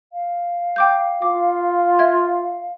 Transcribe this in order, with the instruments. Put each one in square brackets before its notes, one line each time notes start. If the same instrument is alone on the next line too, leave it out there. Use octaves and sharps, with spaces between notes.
[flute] F5
[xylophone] G5 D6 G6
[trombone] F4 [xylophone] D6
[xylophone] E5 G#6